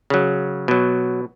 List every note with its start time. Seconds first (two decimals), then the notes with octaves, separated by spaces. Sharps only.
0.10 C#3 F#3
0.68 B2 F#3